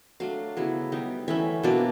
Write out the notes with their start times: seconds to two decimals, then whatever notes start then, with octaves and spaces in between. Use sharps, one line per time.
0.20 F#3 A3 D4 F5
0.57 C#3 F#3 B3 E4
0.92 G3 B3 D#4
1.28 E3 A3 C#4 E5
1.63 B2 F#3 A#3 D4 D5